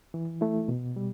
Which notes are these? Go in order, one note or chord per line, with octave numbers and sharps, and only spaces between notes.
E3
A3 E4
B2
G3